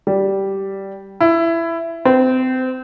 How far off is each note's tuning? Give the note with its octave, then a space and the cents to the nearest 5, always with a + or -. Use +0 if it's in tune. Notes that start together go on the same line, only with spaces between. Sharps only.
G3 -10
E4 +15
C4 -25